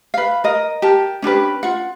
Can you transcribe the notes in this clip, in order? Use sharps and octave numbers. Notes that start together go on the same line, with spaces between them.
B4 F5
A#4 D#5
G4 A#4 A5
C#4 D4 G4 B4
F4 F#5